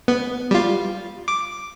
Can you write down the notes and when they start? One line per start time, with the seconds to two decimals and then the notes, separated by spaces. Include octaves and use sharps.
0.08 B3
0.51 G3 F4
1.28 D6